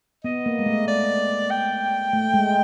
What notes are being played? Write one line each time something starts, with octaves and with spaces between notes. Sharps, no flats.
B3 D#5
A#3
G#3
A3
D5
G5
A3
G#3